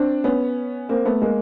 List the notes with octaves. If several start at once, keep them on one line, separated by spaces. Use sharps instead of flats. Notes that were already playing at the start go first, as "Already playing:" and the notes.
Already playing: C4 D4
B3 C#4
A#3 C4
A3 B3
G#3 A#3